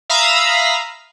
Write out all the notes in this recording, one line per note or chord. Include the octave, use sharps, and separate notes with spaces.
E5 F5 A#5 B5 D#6 E6